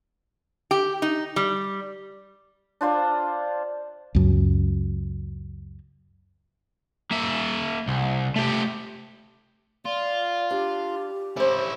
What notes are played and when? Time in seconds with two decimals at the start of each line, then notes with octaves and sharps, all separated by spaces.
0.71 G4
1.02 D#4
1.36 G3
2.81 D4 F4 C5 D5
4.15 C#2 F#2
7.11 A#3 E5
7.88 C2
8.36 A3 G4
9.86 F4 D5
10.51 D4 G4
11.36 C#4 E4 C5 D5